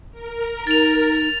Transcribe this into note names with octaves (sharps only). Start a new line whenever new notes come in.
A#4
D#4 A6 F7